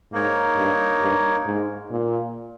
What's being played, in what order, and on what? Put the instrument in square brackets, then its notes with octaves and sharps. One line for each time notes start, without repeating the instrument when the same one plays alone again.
[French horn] G#2 [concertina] A#3 D#4 A#4 C#5
[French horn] G2
G2
G#2
A#2